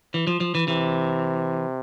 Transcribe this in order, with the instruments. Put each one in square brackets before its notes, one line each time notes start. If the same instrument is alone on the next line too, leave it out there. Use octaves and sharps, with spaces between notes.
[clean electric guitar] E3
F3
F3
E3
[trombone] C3 [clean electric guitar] E3